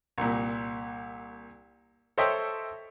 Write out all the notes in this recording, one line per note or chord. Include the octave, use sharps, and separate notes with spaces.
C2 A#2
A4 C5 C#5 D#5 E5 G5